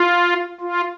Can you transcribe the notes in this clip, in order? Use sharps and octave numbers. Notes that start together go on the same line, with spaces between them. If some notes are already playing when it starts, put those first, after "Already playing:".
Already playing: F4
F4